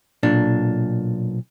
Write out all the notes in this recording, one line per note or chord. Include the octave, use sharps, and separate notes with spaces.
B1 A#2 D4